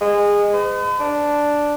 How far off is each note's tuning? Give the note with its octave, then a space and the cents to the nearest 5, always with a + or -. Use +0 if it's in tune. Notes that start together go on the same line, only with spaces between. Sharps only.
G#3 -20
B4 +45
D4 +0